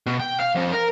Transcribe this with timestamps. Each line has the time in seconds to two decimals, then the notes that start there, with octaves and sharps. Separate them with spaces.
0.06 B2
0.20 G5
0.40 F5
0.55 F2
0.72 A#4